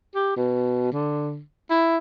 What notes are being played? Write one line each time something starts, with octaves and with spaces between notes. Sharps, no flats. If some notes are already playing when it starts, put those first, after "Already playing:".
G4
B2
D3
E4